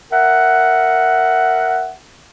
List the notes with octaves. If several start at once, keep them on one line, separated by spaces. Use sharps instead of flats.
A#4 E5 F#5